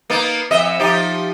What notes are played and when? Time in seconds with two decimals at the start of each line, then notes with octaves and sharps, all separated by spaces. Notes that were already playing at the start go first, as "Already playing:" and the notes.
0.10 A#3 B3 D#4
0.51 F2 D#5 E5
0.80 F3 D#4 G4